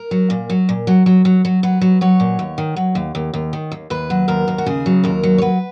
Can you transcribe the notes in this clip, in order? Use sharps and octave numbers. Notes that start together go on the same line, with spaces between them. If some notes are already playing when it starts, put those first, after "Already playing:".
Already playing: A#4
F#3
A#2
F#3
A#2
F#3
F#3
F#3
F#3
F#3 B4
F#3
F#3 C#5
A#2
D#2
D#3
F#3
D#2
D#2
D#2
D#3
D#2
D#2 B4
F#3
D#2 A#4
D#2
F#4
C#3 G#4
F#3
D#2 A#4
F#3
C#5
F#3 B4